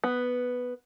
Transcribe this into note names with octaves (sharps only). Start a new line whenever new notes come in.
B3